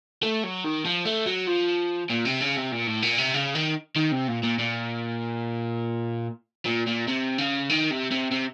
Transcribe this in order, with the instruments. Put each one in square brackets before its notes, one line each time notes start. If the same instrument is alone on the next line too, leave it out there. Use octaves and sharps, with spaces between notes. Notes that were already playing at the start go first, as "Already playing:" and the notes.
[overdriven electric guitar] A3
F#3
D#3
F3
A3
F#3
F3
A#2
C3
C#3
C3
A#2
A2
A#2
C3
C#3
D#3
D#3
C3
A#2
A#2
A#2
A#2
A#2
C3
C#3
D#3
C3
C3
C3